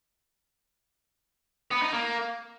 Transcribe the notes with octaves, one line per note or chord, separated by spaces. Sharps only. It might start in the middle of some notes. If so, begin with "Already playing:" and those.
B3
D#4
A#3